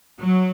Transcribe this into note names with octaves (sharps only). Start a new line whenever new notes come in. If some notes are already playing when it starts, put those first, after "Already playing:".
F#3